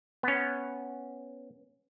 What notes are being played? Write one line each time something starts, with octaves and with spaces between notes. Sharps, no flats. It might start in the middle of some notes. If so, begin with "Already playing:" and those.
B3 C#4